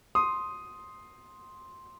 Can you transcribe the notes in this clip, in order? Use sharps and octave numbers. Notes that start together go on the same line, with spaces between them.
C6 D#6